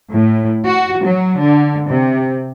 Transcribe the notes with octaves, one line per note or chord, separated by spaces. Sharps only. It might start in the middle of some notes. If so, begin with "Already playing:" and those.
A2
F#4
F#3
D3
C3